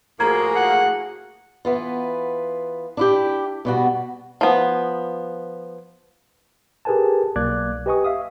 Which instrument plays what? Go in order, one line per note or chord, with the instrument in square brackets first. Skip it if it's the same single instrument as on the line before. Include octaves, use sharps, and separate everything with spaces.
[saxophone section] A2 F3 A#3 [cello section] F#4 G#4 [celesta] A#5 G#6
[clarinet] F#5
[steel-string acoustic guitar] E3 B3 F4
D4 E4 G4
B2 G3 F#4
[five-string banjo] F3 B3
[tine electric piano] G4 G#4 A#4 B4 G#5 A5
B1 A#3 D5 D6 F#6 G#6
G4 B4 D#5 G#5 C#6 D#6
E5 F5 D#6